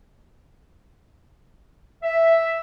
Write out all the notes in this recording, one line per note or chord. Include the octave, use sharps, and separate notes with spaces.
E5